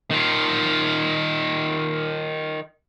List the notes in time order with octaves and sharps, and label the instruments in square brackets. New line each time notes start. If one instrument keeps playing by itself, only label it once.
[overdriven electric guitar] D#3 F4